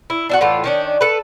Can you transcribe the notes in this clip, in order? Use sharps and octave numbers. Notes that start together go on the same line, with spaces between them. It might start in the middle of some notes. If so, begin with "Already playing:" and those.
E4
D4 E4 F#4
A2 E3 F4 A4
D#3 C#4 D4
A4 B4